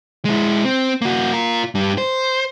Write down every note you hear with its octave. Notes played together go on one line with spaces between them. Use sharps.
G#3 E4
C4
A#3 F#4
F4 A#4
G2 G3
C5